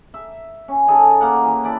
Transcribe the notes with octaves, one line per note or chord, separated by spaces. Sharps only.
E5
C#4
D#3 G#4 A4
A#3 F5 F#5
E3
E4 D5 A5